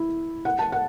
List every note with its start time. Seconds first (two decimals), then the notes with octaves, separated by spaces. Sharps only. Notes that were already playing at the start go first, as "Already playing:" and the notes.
Already playing: E4
0.45 F#5
0.59 A5
0.72 F#5